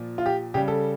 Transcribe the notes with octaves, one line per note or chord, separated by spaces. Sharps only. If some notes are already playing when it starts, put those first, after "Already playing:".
Already playing: A#2 F3
F4
G4
C#3 G3 G4
A4